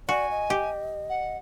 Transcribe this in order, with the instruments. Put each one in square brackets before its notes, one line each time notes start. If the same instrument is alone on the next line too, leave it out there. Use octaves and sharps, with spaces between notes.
[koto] F#4 [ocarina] D5 [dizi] G#5
[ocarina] D#5
[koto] G4
[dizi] F#5